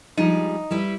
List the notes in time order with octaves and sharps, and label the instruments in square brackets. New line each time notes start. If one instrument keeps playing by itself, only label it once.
[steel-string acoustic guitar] F3 G3 G#3 [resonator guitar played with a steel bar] D#4
[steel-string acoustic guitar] G3 E4 B4